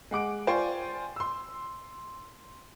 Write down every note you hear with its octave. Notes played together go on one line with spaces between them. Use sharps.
G#3 F#5 D6 D7
F4 C5 D5 G5 G#5 C#6
C6 E6